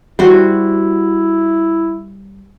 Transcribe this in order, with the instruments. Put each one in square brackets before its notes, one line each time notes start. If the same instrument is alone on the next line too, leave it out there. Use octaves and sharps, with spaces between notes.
[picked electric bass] G3 [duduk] E4 [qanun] F#4 C5